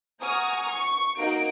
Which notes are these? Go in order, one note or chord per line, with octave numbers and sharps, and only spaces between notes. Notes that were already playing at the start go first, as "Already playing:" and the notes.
F#5 G#5 A#5 C#6 D#6 F6
C#6
A#3 D#4 F#4 D7